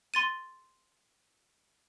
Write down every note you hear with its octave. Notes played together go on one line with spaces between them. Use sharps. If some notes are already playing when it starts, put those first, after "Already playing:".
C6 A6 D#7